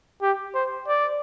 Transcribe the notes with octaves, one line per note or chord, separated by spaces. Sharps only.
G4
C5
D5